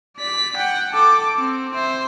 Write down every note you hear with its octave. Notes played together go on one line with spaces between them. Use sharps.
D5 B6
F#5 G5
A4 D6
C4
C5 E5